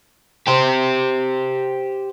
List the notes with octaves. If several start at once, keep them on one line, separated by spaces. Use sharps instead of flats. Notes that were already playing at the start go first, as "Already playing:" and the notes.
G4 C5